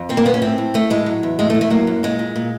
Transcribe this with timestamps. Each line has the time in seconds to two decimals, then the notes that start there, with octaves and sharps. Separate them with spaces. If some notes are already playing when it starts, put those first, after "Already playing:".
Already playing: F2
0.09 A#2 C4
0.17 A#3
0.25 A#2 B3
0.34 C#4
0.42 A2 C4
0.58 A2
0.74 A2 A3
0.90 A2 G#3
1.06 F#3
1.23 E2
1.39 A2 G#3
1.50 A3
1.54 A2
1.61 A3
1.70 F#3 A#3
1.87 F#2
2.03 A#2 G#3
2.19 A#2
2.36 A#2